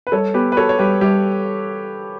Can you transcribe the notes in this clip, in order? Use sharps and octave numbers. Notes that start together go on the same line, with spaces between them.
B4
G3 A4 C#5
B3 G4 B4
B4
F#4 A4 C#5
C#5
G3 G4 B4
G3 G4